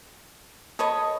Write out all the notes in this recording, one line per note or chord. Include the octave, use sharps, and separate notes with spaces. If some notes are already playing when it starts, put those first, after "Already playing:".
A4 B4 C#5 D#5